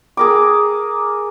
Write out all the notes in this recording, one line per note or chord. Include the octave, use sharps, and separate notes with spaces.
G#4 A#4 D6